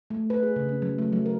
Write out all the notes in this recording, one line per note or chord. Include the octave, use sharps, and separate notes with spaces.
A3
B4
G#4
C#3
C#4
F#3
A3
F#3
A#4